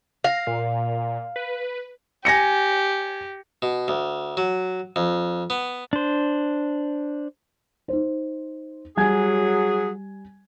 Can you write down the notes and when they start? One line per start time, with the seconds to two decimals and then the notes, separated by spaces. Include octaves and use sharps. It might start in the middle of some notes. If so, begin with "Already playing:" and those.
0.24 F5 A#6
0.47 A#2
1.36 B4
2.25 G4 G#5 A#6 C#7
3.62 B2
3.88 D2
4.37 F#3
4.96 F2
5.50 B3
5.93 D4 C5
7.88 D#4 C5
8.97 F#3 G3 G#4 G#5 G#6